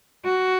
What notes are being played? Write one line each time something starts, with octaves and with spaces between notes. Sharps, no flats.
F#4